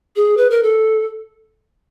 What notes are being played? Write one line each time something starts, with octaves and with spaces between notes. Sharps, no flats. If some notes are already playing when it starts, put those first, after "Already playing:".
G#4
B4
A#4
A4